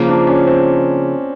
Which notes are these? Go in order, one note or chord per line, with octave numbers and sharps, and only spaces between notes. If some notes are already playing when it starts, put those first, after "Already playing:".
Already playing: C#3 F3 A#3
D4
C#4
C4